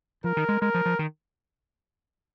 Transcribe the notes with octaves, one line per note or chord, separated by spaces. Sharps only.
F3 A#4
D#3
G#3
G#3 A#4
F3
F3
D#3